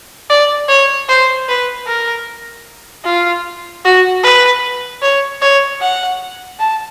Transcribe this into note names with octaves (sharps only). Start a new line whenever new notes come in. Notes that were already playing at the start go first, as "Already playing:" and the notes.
D5
C#5
C5
B4
A#4
F4
F#4
B4
C#5
C#5
F#5
A5